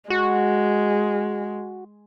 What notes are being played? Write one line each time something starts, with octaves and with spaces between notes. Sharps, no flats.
G#3 F#4